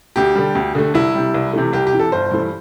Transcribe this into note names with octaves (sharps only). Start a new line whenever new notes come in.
D2 G4
D3 G3
D2
D3 A3
C2 E4
C3 G3
C2
C3 E3 A3
C2 G4
G4
C3 E3
A4
G1 C5
G2 E3 A3